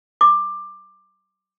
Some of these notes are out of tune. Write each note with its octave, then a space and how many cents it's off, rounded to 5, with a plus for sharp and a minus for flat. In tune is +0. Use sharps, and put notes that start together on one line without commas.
D6 +15